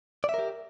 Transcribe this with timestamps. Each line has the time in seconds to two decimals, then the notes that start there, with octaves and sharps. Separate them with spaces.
0.24 D5
0.29 E5
0.34 A#4
0.39 G4